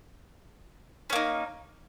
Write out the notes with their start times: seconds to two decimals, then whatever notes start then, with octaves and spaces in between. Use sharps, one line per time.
1.10 C#4
1.13 A#3
1.15 D#4